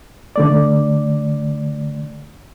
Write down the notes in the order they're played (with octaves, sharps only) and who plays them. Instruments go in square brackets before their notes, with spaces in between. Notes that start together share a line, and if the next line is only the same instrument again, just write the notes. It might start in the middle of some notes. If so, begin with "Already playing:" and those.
[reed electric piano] D3 A3 D5